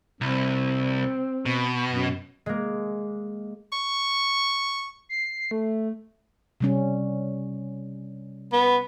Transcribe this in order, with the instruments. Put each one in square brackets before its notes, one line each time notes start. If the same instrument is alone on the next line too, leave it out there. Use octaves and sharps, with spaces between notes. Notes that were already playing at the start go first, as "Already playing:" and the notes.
[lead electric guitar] C2 [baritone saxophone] C4
[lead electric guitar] B2
[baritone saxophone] F#2
[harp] G#3 A#3
[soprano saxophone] C#6
[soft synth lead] C7
A3
[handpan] C3 G3 C#4
[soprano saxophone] B3